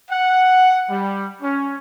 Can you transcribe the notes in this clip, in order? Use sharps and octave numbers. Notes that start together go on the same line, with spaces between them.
F#5
G3
C#4